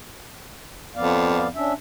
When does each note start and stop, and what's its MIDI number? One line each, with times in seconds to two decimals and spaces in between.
0.96 1.49 41
0.96 1.47 59
0.96 1.47 74
0.96 1.47 77
1.55 1.73 61
1.55 1.73 62
1.55 1.73 76